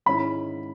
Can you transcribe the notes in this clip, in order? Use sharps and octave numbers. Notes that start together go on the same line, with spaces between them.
G#2 D#3 G#3 C#4 E4 B5